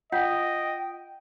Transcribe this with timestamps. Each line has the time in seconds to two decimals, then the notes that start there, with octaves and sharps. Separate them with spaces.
0.12 F4 D#5 F#5 G5 G6 B6